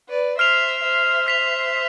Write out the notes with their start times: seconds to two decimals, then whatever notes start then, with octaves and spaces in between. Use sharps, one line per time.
0.10 B4 D5
0.39 C5 E5 F6 C7 F7
0.83 C5 E5
1.27 F6 B6 F7